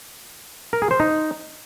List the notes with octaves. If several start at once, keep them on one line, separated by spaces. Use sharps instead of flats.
A#4
G#4
C5
D#4